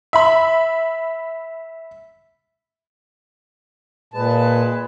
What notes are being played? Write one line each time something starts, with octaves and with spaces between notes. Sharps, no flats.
E5 B5
A#2 G#3 B4 A5